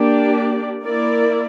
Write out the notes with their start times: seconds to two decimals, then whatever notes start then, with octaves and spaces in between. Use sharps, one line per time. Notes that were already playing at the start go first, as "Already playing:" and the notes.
Already playing: A#3 D4 G4 D5
0.82 A#3 E4 A#4 D5